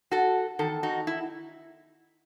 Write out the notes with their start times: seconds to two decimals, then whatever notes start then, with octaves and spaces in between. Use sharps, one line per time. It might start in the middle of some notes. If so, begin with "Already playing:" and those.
0.12 F#4 A4
0.59 E2 D#3 A4
0.83 D#4 F#4
1.07 E4